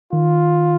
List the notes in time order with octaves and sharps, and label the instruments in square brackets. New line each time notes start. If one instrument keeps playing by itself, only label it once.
[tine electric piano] D#3 [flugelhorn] F4